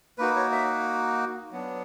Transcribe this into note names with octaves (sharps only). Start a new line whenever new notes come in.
A#3 D#4 F#4 B4
C#5
E5
F#3 B3 D4